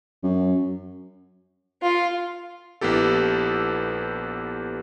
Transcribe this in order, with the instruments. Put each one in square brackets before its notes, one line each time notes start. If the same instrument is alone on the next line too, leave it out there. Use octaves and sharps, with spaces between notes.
[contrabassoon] F#2
[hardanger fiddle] F4
[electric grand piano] A#1 B3 E4 G4 A4